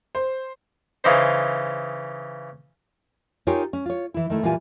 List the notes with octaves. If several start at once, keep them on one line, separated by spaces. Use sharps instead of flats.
C5
C#3 E3 D#4 C5
D#4 F4 G4 G#4 A#4 C#5
C#4
F4 C#5
E3 E4
D#3 A3 E4
A#2 E3 G3 F4 G#5